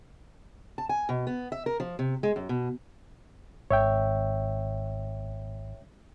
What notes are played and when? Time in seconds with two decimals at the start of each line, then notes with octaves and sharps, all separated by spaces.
0.78 A5
0.89 G#5
1.09 B2
1.27 B3
1.52 E5
1.66 A#4
1.80 F3
1.99 C3
2.23 G#3
2.36 F#2
2.49 B2
3.71 G#1 C#5 E5 G5